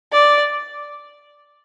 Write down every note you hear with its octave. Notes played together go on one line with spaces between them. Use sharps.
D5